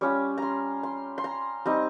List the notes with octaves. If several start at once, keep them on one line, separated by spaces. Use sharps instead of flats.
G3 C#4 F4 C#5
A#5 C6
C6
C6
A#5
G3 C4 D#4 A#5